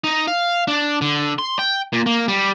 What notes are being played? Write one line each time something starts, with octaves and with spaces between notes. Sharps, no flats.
D#4
F5
D4
D3
C6
G5
A#2
A#3
G3